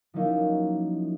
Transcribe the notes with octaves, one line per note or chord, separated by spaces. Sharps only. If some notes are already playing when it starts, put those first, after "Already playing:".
F3 F#3 A#3 C#4 D#4 E4